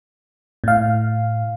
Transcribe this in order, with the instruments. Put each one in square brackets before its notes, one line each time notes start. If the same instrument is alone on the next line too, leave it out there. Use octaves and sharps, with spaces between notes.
[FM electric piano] A2 F5